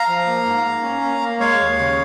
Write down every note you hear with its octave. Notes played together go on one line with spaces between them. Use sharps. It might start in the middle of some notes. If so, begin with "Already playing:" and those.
Already playing: F5 A#5
F3
A#3
G#2
A#3
C#4
A#3
A#3
G#3 C#5 F5
D#2
C#3